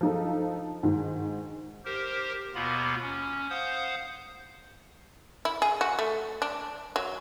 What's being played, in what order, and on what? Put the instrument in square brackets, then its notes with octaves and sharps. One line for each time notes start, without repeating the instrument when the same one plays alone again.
[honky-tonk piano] F3 D#4 A4
G#2 D#3
[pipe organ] G4 A#4 C5
D#2 B2 A#3 B3 F4 B5
C#4
C5 F5 F#5 D#6 G6
[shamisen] E4
G#4
F#4
A3
D4
F#3